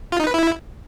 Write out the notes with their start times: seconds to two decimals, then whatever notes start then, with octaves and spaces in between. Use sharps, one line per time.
0.12 F4
0.20 D#4
0.27 B4
0.34 E4